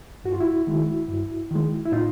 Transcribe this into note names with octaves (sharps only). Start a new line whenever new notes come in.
G2 F#4
F4
E4 F#4
D#3 G#3
G2
D#3 G#3
E4
A2 D#4 F4